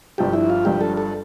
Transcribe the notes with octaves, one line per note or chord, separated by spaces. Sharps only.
G1 G2 F3 G4
E4
F4
G1 G2 F3 G4
A4
A4